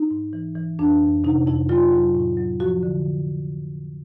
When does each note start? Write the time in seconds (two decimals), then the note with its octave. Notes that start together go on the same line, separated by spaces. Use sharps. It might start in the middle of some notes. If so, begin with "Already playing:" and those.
Already playing: D#4
0.11 G#2
0.33 E3
0.56 E3
0.79 F2 D4
1.02 F2
1.24 C3 D#4
1.46 F2 E4
1.69 F#3 F4
1.92 F#3
2.15 A2
2.37 F#3
2.60 F3 F#4
2.83 D3